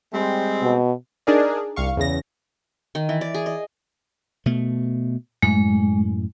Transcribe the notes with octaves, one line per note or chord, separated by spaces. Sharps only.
G3 G#3 C4
B2
D4 D#4 G#4 A#4 D5
C2 F5 C#6
E2 C#3 A#6
D#3
E3
D5
G#4
D#5
B2 A3
F#2 A2 G#3